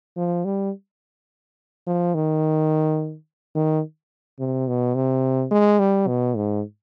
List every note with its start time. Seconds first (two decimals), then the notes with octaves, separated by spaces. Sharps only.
0.17 F3
0.45 G3
1.87 F3
2.14 D#3
3.55 D#3
4.39 C3
4.68 B2
4.95 C3
5.51 G#3
5.80 G3
6.08 B2
6.36 G#2